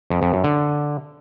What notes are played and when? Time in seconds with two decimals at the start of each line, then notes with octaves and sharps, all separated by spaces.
0.10 F2
0.22 F2
0.33 F#2
0.44 D3